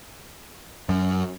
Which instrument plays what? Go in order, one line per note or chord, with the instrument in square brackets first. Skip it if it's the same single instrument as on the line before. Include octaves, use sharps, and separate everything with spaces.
[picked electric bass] F#2